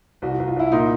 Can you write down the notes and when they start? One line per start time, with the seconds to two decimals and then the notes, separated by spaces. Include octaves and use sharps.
0.22 C2 F#4
0.34 F#4
0.40 C2
0.48 F4
0.56 C2 E4
0.72 A#2 D#4